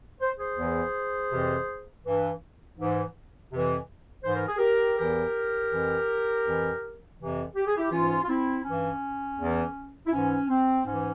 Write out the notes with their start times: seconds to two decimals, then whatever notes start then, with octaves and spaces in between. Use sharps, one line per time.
0.21 C5
0.38 G#4 C5
0.57 E2 E3
1.31 F2 C3 E3
2.05 G2 E3
2.78 G#2 E3
3.51 F2 C3 E3
4.24 G#2 E3 C5
4.36 A#4
4.48 G#4
4.58 G4 A#4
4.98 E2 E3 G4 A#4
5.71 F2 E3
6.45 F2 E3
7.18 F2 C3 E3
7.56 G4
7.66 G#4
7.77 E4 G4
7.92 G#2 E3 C#4 F4
8.23 F4
8.28 C4 E4
8.65 G2 E3 C#4
9.38 E2 E3
10.06 E4
10.13 G#2 E3 C#4
10.48 C4
10.85 G#2 E3 C#4